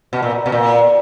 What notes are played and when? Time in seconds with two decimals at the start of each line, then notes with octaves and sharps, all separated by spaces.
0.13 B2
0.23 A#2
0.46 B2
0.52 A#2